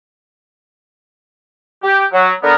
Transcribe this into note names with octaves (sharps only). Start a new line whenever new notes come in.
G4
F#3
D3 B3 A#4